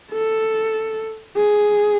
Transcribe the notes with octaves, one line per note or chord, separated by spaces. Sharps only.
A4
G#4